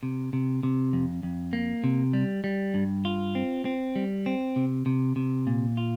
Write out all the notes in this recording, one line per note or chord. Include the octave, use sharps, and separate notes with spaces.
C3
C3
C3
F2
F2
A#3
C3
G3
G3
G2
F4
C4
C4
G3
C4
C3
C3
C3
A#2
F4